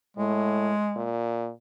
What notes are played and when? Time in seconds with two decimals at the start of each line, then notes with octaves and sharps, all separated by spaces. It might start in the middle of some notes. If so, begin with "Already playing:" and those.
0.17 A2 G#3
0.96 A#2